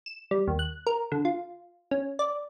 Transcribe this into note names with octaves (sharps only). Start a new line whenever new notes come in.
E7
G3
D#2
F#6
A#4
D3
F4
C#4
D5